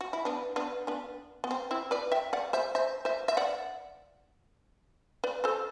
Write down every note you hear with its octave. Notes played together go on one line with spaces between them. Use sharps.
F#4
E4
B3 D4
B3 D4
B3 D4
B3
C4
C4 E4
B4 D5
E5 G5
D5 F#5
C5 E5
C5 E5
C5 E5
E5
D5 F#5
B4 D5
A4 C5